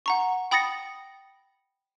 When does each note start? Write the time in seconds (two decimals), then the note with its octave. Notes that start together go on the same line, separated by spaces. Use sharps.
0.06 F#5 A#5 C#6
0.51 G5 B5 D#6 A6 A#6 C#7